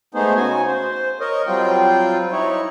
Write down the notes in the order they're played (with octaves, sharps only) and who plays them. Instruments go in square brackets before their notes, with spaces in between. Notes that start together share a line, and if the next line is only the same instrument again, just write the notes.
[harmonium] G#3 A3 B3 D#4 G#4 C5
C#3 F#4 G#5
C5
A#4 C#5 D#5
F#3 G3 C4 F4 G5
D#4 E4 C#5